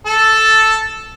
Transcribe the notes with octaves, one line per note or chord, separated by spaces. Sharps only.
A4 A5